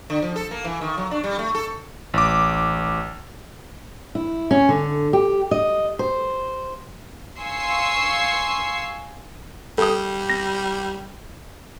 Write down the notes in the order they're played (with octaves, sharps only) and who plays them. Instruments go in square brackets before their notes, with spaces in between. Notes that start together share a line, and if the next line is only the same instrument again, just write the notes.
[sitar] D3
F3
A4
A#3
E3
D#3
F#3
D4
G3
A3
A4
[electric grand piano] A1 D6
[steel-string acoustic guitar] E4
C#4
D3
G4
D#5
C5
[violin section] F5 G#5 C6 C#6 E6 C7
[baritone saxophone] G3 [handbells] A4 D#6
[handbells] A#6